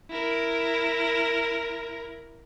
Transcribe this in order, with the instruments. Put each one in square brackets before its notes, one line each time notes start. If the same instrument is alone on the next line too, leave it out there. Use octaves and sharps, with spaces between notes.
[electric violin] E4 A#4